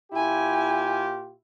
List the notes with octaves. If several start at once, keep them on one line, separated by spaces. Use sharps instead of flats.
A#2 E4 F4 G4 G#5